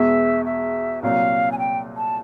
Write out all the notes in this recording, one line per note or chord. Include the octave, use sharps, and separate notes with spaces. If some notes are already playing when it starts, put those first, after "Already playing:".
Already playing: E2 B2 G#3 E5
E5
C2 A#2 F#3 F5
G#5
G5
A5